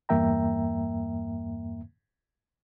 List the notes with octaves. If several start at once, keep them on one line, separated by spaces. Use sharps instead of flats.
E2 G2 A#3 E5 G5 A#5